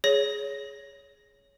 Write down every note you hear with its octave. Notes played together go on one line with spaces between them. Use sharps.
G#4 C#5 A#6